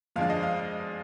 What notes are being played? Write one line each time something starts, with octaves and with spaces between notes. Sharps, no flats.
F2 F3 G#3 D4 F5
D#5
F5